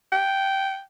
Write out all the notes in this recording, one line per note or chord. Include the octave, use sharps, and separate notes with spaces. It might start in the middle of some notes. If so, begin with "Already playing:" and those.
G5